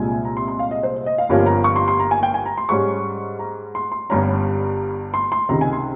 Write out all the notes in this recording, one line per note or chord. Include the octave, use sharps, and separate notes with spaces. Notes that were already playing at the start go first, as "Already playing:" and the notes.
Already playing: C2 A#2 G#3 G#5
A#5
C6
C6
F5
D#5
C5
D#5
F5
G1 G2 F3 A#3 C#4
A#5
C#6
C6
C6
A#5
G#5
G5
G#5
A#5
C6
G#2 G3 C#4 C#6
A#5
C6
C6
G1 G2 G3 C#4 A#5
C6
C6
C#2 C3 D#3 A#5
G#5
C6